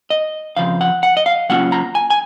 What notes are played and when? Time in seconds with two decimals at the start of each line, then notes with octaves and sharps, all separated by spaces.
0.10 D#5
0.57 F2 C#3 F3 F5
0.81 F#5
1.03 F#5
1.17 D#5
1.26 F5
1.50 C#3 F#3 A#3 C#4 F4 F#5
1.72 A#5
1.95 G#5
2.10 G#5